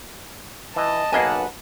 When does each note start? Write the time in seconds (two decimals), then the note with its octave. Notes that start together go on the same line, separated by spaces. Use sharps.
0.76 E3 D#5 A5
1.12 B1 A#3 D#4 G#4 B4 D#5 F#5 G#5